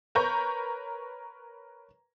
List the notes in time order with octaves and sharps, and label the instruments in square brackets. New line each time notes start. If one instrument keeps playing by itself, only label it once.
[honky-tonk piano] A#4 B4 C#5 A#5 C#6 G6